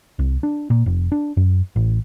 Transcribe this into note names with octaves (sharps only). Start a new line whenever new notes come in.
C2
D4
A#2
F1
D4
F#2
A1